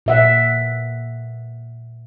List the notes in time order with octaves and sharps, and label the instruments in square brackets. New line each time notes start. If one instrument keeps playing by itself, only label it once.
[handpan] A#2 E5 F#5